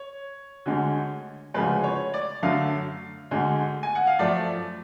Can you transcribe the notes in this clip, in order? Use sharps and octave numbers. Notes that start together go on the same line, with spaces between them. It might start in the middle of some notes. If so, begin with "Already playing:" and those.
Already playing: C#5
D2 D3 G#3
D2 C#3 F3 G#3 B4
C#5
D5
F#2 D3 F#3 A3 F5
D2 D3 G#3
G#5
F#5
F5
F#2 F3 A3 D5